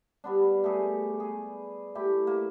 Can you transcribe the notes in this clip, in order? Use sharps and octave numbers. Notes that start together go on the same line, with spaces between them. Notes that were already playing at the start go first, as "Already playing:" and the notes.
G3 B3 D4
A3 G4 G#4
G#4
A3 E4 G4
A#3